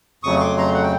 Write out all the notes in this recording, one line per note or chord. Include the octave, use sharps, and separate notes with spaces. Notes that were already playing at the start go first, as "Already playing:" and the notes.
F2 C#3 F#3 A3 C#6 D#6
C6 D6
A#5 C6
F#5
G5